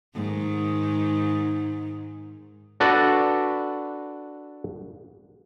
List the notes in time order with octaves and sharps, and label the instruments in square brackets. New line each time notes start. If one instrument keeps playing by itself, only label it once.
[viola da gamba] G#2 D#3
[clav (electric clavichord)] D4 F#4 A4 B4 D5